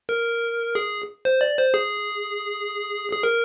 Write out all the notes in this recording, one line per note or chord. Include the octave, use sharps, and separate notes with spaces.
A#4
G#4
C5
D5
C5
G#4
G#4
A#4